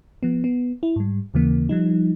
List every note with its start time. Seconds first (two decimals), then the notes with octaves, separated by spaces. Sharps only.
0.23 F3 B3
0.44 B3
0.83 E4
0.96 G#2 G3
1.34 D#2 C#3 E3 A#3
1.69 F3 G3 D#4